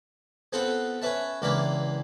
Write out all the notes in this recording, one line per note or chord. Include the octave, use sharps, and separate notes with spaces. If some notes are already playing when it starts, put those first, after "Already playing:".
B3 C4 F4 A4 B4 F#5
C#4 B4 E5 A5
C#2 E3 A#3 D4 F5 B5